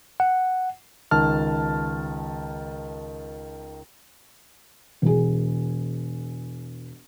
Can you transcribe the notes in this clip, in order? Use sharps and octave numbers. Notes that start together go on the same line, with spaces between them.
F#5
C#2 D#3 A5 F6
E1 G#4